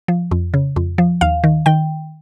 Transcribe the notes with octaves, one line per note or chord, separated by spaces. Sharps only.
F3
F2
C#3
F2
F3
D#2 F5
D#3
D#3 G5